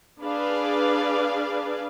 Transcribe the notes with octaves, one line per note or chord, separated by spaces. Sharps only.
D4 G#4 B4 D5 F5